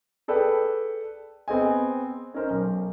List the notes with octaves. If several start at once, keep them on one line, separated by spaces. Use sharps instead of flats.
G#4 A4 B4 D5 G5
B3 C4 G#4 D#5 G#5
C#4 D#4 A#4 C5
B1